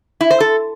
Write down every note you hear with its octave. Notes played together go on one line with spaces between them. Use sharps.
E4
C5
A4